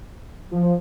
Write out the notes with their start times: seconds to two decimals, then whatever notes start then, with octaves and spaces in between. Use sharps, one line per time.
0.51 F3